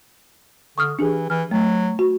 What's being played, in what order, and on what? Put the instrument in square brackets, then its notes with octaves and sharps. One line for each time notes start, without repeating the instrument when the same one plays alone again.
[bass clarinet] D3 [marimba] C#6 D#6 F6
[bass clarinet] E3 [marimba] D4 G4 G#4
[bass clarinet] E3 [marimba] F6
[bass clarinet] F#3 [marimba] A3
[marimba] F#4